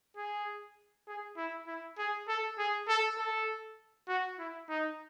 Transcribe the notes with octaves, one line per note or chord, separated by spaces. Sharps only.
G#4
G#4
E4
E4
G#4
A4
G#4
A4
A4
F#4
E4
D#4